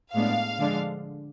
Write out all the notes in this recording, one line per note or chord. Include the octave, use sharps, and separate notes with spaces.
A2 G#3 B3 D4 F5
D3 F3 G#3 D4